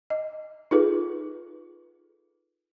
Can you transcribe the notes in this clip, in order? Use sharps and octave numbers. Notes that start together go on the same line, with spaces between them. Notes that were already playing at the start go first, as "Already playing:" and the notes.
D#5
D#4 F4 G#4 A4 B4